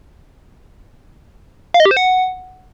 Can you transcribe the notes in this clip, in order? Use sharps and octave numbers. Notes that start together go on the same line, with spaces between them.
F5
D#5
G4
C5
F#5